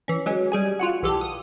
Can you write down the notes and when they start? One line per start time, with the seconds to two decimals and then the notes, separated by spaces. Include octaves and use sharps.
0.08 E3 C#4
0.26 F#3 G#3 C#4
0.52 G3 G#4 G#5
0.79 F4 F#4 F#5
1.03 B1 E3 G4 A4
1.21 D#6